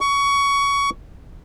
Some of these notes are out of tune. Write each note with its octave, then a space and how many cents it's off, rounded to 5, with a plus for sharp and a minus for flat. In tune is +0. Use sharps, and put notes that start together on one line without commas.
C#6 +20